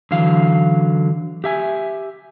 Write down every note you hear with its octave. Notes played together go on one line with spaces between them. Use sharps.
D3 E3 F#3 F5
G4 E5 G#5